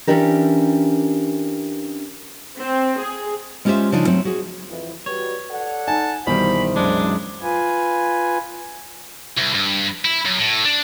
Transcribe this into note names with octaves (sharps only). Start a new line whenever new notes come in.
E3 G#3 C#4 D4 G4 A#4
C4
G#4
G#3 C#4 F4 G4 C5 E5
C#3 F3 D4 D#4 F4 G#5
F#3 A3 C4
F#4 G#4
F2 E3
G3 F#4 B4 C#5
A4 D5 F#5
D#4 G#5 A5
C2 B2 D#3 E3 G3 C5 B5
F#2 G#3 D4
F4 B4 G#5
C2
G2
E4
F#2
A2
D4